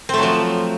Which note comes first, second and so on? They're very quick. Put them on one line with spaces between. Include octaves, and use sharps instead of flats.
C4 A3 F#3 F3